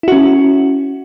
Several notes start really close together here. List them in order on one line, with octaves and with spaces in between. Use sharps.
E4 F#4 C#4